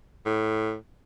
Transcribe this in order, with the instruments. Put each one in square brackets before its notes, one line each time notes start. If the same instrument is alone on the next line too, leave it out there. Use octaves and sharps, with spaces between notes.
[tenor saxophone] A2